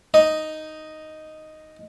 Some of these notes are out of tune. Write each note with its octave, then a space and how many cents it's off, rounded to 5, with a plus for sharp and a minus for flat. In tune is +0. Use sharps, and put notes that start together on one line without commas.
D#4 +0 D#5 +0